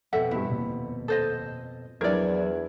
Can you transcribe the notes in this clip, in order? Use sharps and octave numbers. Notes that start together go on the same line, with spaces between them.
F2 B2 A4 E5 F#5
E2 G2 E4
D#1
A4 C5 D#5
E2 F3 F#3 D4 E4 A#4 D5 G#6